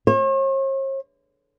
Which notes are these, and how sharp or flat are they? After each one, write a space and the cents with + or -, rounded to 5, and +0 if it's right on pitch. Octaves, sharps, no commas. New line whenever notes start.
C#5 -45